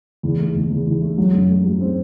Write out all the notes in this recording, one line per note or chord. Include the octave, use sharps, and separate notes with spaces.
E2
A3
E2
E2
E2
A3
F#3
F#2
A3
F#3
C4